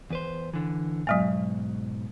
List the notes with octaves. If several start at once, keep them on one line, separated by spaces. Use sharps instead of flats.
E2 B4 C5
D3 E3
G#2 B2 F#3 G#3 B3